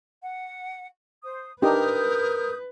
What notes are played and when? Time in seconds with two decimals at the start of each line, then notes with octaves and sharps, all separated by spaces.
0.22 F#5
1.23 C5 D#6
1.62 D4 D#4 G4 A#4 B4 D#6 G6